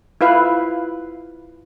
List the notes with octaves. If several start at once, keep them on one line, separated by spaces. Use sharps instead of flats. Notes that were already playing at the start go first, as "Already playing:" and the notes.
E4 F4 B4 F5